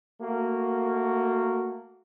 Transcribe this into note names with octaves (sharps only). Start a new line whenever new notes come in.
A3 A#3 F#4